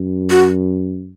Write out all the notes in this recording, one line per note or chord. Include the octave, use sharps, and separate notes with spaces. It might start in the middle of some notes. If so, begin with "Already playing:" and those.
Already playing: F#2
F#4